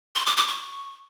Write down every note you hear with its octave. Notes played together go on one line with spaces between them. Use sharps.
C6
D6
D6
C#6